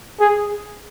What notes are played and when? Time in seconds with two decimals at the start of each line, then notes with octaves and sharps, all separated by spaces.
0.20 G#4